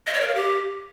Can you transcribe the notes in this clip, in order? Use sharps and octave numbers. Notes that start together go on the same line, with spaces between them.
D#5
C#5
A#4
F5
G4